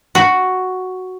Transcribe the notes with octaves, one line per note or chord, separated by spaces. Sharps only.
F#4